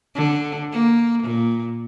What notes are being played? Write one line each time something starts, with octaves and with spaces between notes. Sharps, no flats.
D3
A#3
A#2